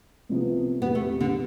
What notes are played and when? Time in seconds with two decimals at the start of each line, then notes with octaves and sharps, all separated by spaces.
0.29 C2 C3 F3 B3
0.82 E2 C3 G3 B3
0.95 A3
1.21 D3